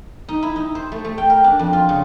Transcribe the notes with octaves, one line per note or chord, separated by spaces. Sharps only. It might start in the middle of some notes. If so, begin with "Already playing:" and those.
D#4
E4
D#4
C5
A3
A3
G5
A#4
D4
F2
F4
C#3